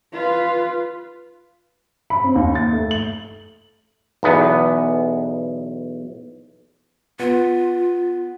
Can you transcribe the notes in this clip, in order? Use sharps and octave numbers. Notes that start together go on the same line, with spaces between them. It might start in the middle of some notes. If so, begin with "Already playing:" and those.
F4 B4
B5
C4
D#2
A6
A3
F#7
B1 E2 B3
B3 F4 F#5